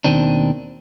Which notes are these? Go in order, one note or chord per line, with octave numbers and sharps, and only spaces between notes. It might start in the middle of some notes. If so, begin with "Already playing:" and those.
D#2 G#2 B2 D#3 C4 D4